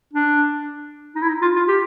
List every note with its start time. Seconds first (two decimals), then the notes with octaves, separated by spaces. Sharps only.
0.13 D4
1.15 D#4
1.22 E4
1.28 D#4
1.42 F4
1.56 F4
1.68 G4